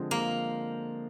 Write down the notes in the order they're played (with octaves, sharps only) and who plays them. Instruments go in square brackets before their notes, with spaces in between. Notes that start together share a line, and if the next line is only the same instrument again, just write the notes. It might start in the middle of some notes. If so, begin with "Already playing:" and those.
Already playing: [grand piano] D3 F3 G#3 C4
[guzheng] A#3